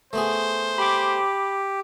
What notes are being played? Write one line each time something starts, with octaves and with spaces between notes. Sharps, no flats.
A3 B3 G#4 C5
G4 B5 D6